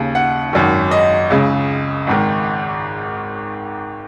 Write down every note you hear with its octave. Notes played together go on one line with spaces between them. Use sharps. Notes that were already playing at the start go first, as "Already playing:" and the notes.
Already playing: D#2 C#3
F#5
G#1 F#2 D#3
D#5
C#2 C#3
G#1 G#2 D#3